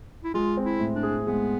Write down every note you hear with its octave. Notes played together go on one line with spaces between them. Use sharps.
E4
G#3 F4
C4
E4
A2
D4
G#4
G#3 B3